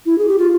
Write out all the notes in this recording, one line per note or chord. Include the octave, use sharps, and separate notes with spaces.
E4
G#4
G4
F4